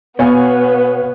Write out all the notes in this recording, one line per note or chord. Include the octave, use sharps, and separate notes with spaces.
B2 B3 C#5 F5 G#5